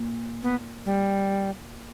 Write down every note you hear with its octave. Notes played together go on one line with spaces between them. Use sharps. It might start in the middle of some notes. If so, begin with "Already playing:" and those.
Already playing: A#2
B3
G3